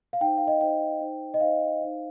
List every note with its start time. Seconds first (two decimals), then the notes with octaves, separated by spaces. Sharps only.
0.13 F5
0.21 D#4 C5 G5
0.38 F5
0.47 D#5
0.61 D#4 C5 G5
1.01 D#4 C5
1.34 D#5
1.41 D#4 C5 F5
1.81 D#4 C5